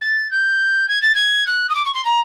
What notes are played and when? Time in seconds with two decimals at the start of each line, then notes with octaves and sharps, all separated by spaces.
0.01 A6
0.31 G6
0.88 G#6
1.02 A6
1.15 G#6
1.47 F#6
1.69 D#6
1.75 D6
1.85 C#6
1.94 C6
2.05 A#5